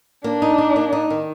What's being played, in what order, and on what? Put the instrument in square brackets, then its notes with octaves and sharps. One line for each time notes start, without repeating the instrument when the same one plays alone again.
[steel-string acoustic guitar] A#3 [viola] D4
[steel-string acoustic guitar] D#4
D#4
A#3
D#4
D#3